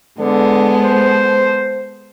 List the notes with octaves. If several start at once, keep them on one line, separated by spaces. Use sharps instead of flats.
D3 G#3 B3 A4
C5